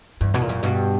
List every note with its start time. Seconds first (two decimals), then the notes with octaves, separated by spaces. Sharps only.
0.21 E2 G2
0.34 E2 B2
0.41 A#2
0.49 F#2
0.63 G2 B2